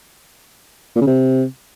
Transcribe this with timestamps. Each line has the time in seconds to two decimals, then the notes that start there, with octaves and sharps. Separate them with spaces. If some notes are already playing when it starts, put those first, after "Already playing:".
0.96 A#2
1.01 C#3
1.07 C3